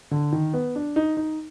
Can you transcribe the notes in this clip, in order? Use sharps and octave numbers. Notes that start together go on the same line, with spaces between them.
D3
D#3
B3
D4
D#4
D#4